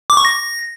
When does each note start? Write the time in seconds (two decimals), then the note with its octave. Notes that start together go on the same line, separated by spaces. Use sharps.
0.10 D6
0.17 C#6
0.25 A#6